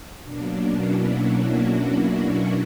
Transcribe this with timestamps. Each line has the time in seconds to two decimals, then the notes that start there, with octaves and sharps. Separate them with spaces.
0.23 B2 F#3 A#3 D4
0.51 C#4
0.80 E4
1.08 F#4
1.36 F#4